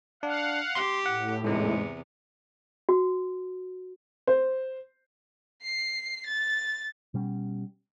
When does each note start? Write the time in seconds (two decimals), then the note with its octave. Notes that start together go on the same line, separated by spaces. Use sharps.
0.23 D4 F5 F#5
0.75 G4 C6
1.06 A2 F#5
1.44 E2 G#2 C3 G#3
2.89 F#4
4.27 C5
5.62 C7
6.26 A6
7.14 B2 G3 C#4